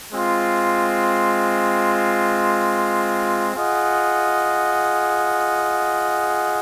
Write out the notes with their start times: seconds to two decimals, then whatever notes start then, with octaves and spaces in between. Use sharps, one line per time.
0.11 G#3 C4 F4
3.55 F4 G#4 D#5 F#5